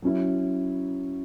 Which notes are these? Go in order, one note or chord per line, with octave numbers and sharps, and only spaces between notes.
F#3 C#4 E4